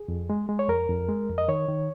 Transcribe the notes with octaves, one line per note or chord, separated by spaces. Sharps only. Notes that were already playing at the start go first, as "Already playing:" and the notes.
Already playing: G#4
F2
G#3
G#3
C#5
F2 A#4
F2
G#3
F2
D#5
D#3 C#5
D#3